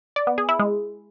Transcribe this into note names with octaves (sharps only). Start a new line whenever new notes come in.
D5
B3
G#4
E4
G#3